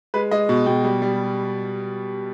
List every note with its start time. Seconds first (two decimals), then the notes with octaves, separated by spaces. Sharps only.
0.14 G#3 B4
0.31 G#3 D#5
0.49 B2
0.66 B2 G5
0.84 G3
1.02 G3